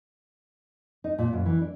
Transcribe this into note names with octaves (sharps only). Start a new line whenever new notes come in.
D#4
A#2
F#2
E3
D4